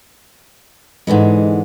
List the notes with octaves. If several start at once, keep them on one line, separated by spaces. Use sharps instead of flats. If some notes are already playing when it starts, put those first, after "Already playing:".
G#2 D3 E3 G#3